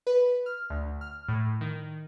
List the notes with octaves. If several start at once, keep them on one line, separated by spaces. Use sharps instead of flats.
B4
F6
D2
F6
A2
D#3